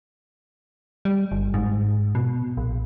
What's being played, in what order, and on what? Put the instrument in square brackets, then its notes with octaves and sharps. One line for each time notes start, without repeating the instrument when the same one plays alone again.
[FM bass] G3
G1
G#2
B2
A#1